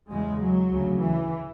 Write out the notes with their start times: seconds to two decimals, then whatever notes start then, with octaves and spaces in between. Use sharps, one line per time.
0.10 E2 C#3 G#3
0.41 F#3
0.71 D2 C#3
1.01 E3